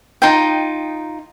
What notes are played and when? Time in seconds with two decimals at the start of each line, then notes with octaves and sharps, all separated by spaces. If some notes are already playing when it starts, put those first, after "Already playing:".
0.22 D#4 F4 G5